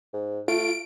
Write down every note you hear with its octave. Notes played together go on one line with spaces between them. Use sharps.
G#2
A3 F4 D7